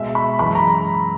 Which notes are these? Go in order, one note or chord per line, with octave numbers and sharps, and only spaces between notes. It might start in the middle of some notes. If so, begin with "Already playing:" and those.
Already playing: B2 G#3 E5
B5
F#2 E3 G#3 B5
A#5